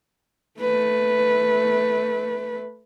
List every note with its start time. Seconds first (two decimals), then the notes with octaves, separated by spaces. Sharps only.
0.60 A3 B4